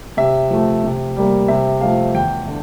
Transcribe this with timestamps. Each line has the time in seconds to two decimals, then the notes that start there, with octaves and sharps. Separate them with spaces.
0.17 C3 E5
0.50 F3 A3
0.84 C3
1.16 G3 A#3
1.48 C3 E5
1.81 F3 A3 C4 F5
2.15 E2 G5
2.48 D3